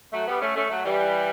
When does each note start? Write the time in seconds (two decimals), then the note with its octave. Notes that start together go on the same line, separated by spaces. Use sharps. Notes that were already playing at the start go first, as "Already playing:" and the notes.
0.13 F#3 A3
0.27 G3 B3
0.41 A3 C#4
0.56 A3 C#4
0.70 F#3 A3
0.85 E3 G3